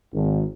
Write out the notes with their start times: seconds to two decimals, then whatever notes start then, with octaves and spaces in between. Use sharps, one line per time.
0.13 G#1